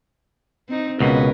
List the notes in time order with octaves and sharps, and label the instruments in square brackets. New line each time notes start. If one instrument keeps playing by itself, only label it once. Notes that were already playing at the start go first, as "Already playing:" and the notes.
[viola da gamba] C4 D#4
[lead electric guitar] C#2 B2 [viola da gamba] C#4 A#4 B4